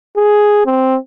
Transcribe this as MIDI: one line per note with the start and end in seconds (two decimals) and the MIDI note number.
0.17 0.63 68
0.66 0.97 60